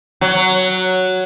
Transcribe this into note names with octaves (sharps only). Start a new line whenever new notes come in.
F#3